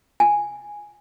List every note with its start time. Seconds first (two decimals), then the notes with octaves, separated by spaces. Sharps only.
0.20 G#5